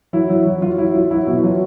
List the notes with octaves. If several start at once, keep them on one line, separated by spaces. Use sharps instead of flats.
F#3 E4
F#3
F#3
F#3 F4
F#3 E4
F#3 F4
F#3 E4
B2 E4
F#3 F4